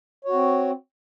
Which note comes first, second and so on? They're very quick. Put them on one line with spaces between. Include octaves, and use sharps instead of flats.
C#5 F#4 C4